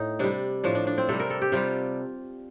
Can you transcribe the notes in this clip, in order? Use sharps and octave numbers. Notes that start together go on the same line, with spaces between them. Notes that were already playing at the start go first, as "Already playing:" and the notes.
Already playing: A2 D#4
C3 G3 D4
A2 F3 D4
D4
D4
C4
C3 G3 A4
A#4
A4
G4
C3 G3 F4